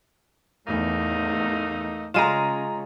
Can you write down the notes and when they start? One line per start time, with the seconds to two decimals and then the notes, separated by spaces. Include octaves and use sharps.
0.68 E2 A2 A3 A#3 D#4
2.14 C#3 G#3 F4 A#5 D#7 E7